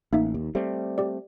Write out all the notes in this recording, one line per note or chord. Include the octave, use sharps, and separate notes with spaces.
A1 A#3 D#4 E5
D#2
G3 A3 C4
G4 D5